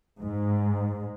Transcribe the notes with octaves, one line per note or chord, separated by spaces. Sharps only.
G#2